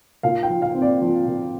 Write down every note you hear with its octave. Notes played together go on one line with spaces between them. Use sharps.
A#2 F5
G5
F3
F5
C4
D5
F3
A#2